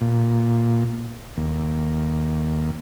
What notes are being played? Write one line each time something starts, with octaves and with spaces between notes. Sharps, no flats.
A#2
D#2